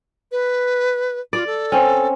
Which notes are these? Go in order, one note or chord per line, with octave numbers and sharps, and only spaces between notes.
B4
F4 D5
A4
C4 C#4